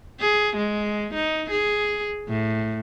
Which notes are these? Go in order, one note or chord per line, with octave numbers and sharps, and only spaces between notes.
G#4
G#3
D#4
G#4
A2